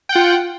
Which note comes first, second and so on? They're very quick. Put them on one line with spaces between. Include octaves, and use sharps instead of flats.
G5 F#5 F4